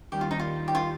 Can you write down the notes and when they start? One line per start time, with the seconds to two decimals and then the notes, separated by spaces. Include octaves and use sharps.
0.11 D#2 D#3 G3 G4
0.21 F4
0.31 D#4
0.40 F4
0.68 G4
0.75 F4